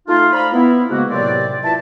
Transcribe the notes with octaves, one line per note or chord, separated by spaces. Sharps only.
A3 D#4 F4
C5 D5 F5 A#5 B5
B3 E4
G#2 C#3 G#3 A#3 F#4
D#2 A2 C3 F#3 C4 D5
E4 F4 B4 E5 A5